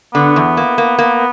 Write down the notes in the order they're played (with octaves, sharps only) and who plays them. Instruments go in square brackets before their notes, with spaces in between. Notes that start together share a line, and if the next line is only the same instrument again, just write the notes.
[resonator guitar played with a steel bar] D3 [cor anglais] B3
[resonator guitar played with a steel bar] E2
A#3
A#3
A#3